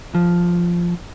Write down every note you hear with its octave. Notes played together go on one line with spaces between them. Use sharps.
F3